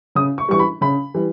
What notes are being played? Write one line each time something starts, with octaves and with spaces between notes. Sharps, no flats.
C#3 D#6
C#6
E3 G3 C#6
B5
C#3 B5
E3 G3